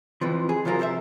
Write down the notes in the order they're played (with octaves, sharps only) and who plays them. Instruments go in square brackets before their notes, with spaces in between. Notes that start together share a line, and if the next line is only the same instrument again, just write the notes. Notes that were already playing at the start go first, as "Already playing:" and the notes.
[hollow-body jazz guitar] F2 E3 F3
G#4
C3 F3 F#3 F4 A#4
A4 C5 C#5 E5